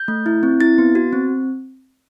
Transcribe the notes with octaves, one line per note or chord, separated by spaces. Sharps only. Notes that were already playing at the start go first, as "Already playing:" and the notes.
Already playing: G6
A3
E4
C4
E4 A6
B3
F#4
C4